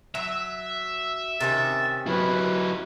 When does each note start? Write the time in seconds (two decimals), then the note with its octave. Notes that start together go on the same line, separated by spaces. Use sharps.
0.15 F#3 E5
1.40 C3 D#3 C#4 A6
2.06 F#3 E4 B4